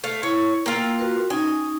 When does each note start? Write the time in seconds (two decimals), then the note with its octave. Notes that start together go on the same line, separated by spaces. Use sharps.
0.04 A3 F5
0.23 E4 C#5
0.66 A#3 F4 G5 E6
0.99 F#4 A#4 B4
1.30 C#4 D#4 G#5